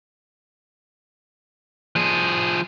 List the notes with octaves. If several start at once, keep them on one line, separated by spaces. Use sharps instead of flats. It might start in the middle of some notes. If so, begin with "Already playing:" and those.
F3 G#4